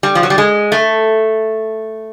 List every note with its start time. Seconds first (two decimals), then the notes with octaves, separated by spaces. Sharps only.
0.03 G3
0.15 F3
0.23 F#3
0.30 G3
0.38 G#3
0.72 A3